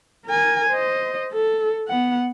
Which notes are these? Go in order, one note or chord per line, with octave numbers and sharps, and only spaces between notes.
A#4 G#5
C5 D#5
A4
B3 F#5